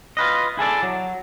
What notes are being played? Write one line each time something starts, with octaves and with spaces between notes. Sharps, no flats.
F4 B4 D#5
E4 G#4 A4 D5
F#3